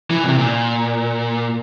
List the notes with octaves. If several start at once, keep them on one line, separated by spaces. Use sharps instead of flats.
E3
C3
A#2